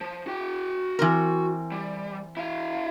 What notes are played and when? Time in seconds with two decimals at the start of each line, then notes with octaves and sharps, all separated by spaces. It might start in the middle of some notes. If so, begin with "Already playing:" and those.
0.01 F3
0.27 F#4 G5
0.99 E3 C4 A#4
1.72 G3
2.37 E4 F5